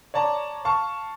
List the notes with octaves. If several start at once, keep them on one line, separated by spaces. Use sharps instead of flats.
C#5 D5 A5 A#5
F5 A5 C#6